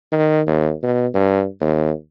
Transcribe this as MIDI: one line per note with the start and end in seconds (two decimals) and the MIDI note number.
0.12 0.42 51
0.47 0.72 39
0.83 1.07 47
1.14 1.45 43
1.61 1.91 39